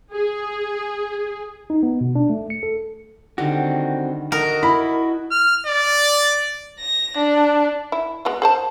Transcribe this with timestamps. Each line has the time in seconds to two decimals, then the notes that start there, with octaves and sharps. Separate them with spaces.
0.14 G#4
1.70 D#4
1.83 B3
2.01 B2
2.15 D4
2.30 A3
2.50 C#7
2.63 A4
3.38 D3 D#3 G3 C4 F#4
4.32 F#4 A4 A#4 D#5
4.63 E4 B5
5.31 F6
5.67 D5
6.80 A#6
7.17 D4
7.92 E4
8.25 G#3 B3 F#4
8.42 G#4 C5 A5